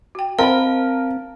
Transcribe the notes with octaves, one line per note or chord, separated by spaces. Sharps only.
F#4 G5
C4 A#4 D#5 F5 F#5 A5 B5